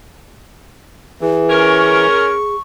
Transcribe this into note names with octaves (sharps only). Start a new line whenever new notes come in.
E3 G#4
C#4 A#4 C#6